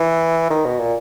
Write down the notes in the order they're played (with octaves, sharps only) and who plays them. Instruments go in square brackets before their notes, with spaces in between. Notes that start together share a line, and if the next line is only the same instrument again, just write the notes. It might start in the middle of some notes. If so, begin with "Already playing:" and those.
Already playing: [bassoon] E3
D#3
B2
A#2